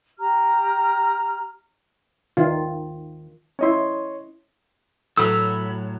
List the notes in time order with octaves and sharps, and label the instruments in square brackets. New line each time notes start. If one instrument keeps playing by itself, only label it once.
[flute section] G4 A#5 F6
[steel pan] D#3 F4
[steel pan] C#4 E4 [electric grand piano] C#5 D#5 C6
[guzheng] A2 F#3 [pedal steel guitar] B5 E6